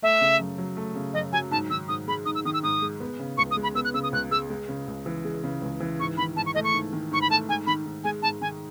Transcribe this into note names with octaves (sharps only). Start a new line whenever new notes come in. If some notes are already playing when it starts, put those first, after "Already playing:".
A3 E5
C#3
F#2
F#3
A3
C#3
F#2 D#5
F#3 G#5
G#2 A5
D#3 E6
G#2 D#6
G#3 B5
G#2 D#6
E6
D#3 D#6
E6
G#2 D#6
G#3
B3
C#3
C#2 C#6
D#6
G#3
B5
B3 E6
F#6
C#3 E6
D#6
C#2 F#6
G#3 E6
G#3
C#3
C#2
E3
G#3
C#3
C#2
E3
G#2 C#6
D#3 B5
G#2 A5
C#6
A3 D#5
C#6
G#2
D#3
G#2 C#6
B5
A3 A5
G#2 G#5
D#3 B5
G#2
G#3 G#5
G#2 A5
D#3 G#5